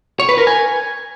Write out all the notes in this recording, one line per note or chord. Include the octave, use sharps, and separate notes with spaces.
C#5
B4
A#4
G#5